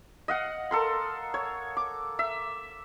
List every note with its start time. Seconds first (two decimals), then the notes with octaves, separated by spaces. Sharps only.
0.28 D#5 F5 F#5
0.71 A4 A#4 C6
1.34 C#5
1.77 D6
2.19 E5